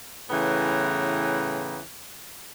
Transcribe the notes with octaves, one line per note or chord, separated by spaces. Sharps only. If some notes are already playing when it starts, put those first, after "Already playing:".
A2 C#3 E3 B3 G5 A#5